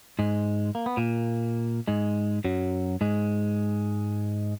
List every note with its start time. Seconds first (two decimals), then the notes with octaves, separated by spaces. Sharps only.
0.19 G#2 G#3
0.75 A#3
0.86 B3
0.97 A#2 A#3
1.88 G#2 G#3
2.44 F#2 F#3
3.01 G#2 G#3